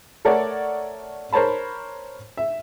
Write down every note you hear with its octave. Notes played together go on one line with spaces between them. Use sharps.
A3 A4 A#4 C#5 D5 F#5
A#4 C5 C#5 A5 B5
E5